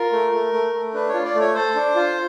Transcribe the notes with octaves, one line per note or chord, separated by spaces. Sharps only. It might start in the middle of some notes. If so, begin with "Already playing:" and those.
Already playing: F4 A#4
A3
A3
A3
A3
D4 B4
C#5
F4
D5
A3
C#5
A4 C5
D4
F4